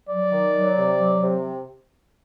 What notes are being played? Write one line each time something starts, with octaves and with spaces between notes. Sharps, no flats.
F#3 D5
D#3
F#3
C3
F#3
C3